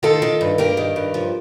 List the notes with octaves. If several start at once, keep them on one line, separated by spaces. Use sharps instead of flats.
D#3 F4 A4
D#3
G2
G2 G4 A#4
D#3
G2
F3